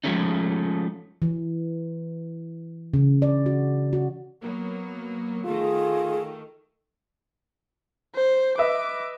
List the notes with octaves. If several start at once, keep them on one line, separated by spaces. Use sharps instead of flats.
F3 G#3 A3 C#4 D#4
E3
C#3
D5
F#4
F#4
F#3 A#3 B3
D#3 A3 F4 G#4
C5
B4 D#5 E5 D6